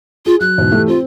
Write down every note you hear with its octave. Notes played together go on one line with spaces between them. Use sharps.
F4 G#4
F#3 F#6
E2 G#2 B2
E3 A3 G4
C4 F4